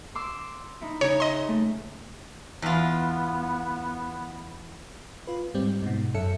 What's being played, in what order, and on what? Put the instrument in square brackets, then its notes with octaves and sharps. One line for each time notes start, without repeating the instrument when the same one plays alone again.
[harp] C6 D6 E6
D#4 E4
[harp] C#3 D#4 [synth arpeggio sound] C#5
[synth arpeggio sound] D#5 C6
[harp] A3
[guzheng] E2 F4 [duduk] B3
[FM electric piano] F4 B4
G#2 G3 C4
G#2 B2
F#2 A4 E5 C#7